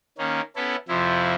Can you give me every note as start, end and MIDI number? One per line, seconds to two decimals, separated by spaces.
0.18 0.41 51
0.18 0.41 58
0.18 0.41 61
0.56 0.76 59
0.56 0.76 61
0.56 0.76 64
0.56 0.76 69
0.89 1.35 41
0.89 1.35 48
0.89 1.35 53
0.89 1.35 64